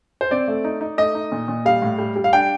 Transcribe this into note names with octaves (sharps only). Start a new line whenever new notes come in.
C5
C4 D5
A3
D#4
D#4
A3 D#5
D#4
A#2
A#2
G3 F5
A2
G3
G3
F5
D4 G5